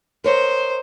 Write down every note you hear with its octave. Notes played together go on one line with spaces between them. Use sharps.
A#4 C5 C#5 D#5